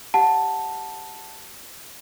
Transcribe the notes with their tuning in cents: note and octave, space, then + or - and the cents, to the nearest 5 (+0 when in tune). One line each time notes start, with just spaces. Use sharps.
G4 +0 F#5 -15 A5 +0